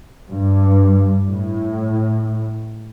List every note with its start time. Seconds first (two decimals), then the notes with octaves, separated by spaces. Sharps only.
0.30 G2
1.31 A2